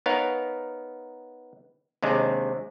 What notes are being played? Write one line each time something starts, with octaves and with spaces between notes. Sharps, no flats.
B3 D#4 A#4 C#5 F5
D#2 C3 G#3 D4